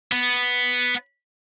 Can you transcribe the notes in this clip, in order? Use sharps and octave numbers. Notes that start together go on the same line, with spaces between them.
B3